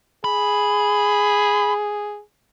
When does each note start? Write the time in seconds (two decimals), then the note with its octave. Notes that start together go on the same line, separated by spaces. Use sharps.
0.24 G#4 B5